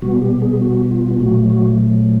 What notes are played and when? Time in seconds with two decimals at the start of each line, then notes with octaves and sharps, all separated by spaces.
0.02 B2 G3 B3 F#4
0.22 G4
0.42 G#4
0.61 F#4
0.91 F4
1.20 A#2 F#3 A3 F#4
1.50 F#4